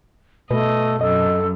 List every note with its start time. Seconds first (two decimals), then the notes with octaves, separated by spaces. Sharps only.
0.51 B2 A3 B4 D#5
1.01 F#2 A4 D#5